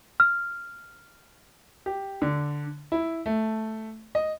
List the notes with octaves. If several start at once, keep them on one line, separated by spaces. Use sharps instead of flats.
F6
G4
D3
E4
A3
D#5